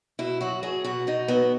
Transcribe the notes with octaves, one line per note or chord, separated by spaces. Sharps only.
B2 E4
F#3 F#4
F#3 G#4
B2 F#4
B2 D#4
F#3 B3